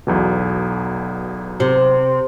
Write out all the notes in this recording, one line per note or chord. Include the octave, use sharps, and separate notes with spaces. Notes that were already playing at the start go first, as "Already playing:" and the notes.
B1 E2 B2
C3